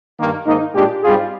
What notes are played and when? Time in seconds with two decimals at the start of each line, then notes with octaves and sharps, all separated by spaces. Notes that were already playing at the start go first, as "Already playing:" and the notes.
0.18 G2 D#3 A#3
0.46 G#2 D#3 A#3 D#4
0.74 A#2 G#3 D4 G4
1.03 G#2 G3 C4 F4 G#4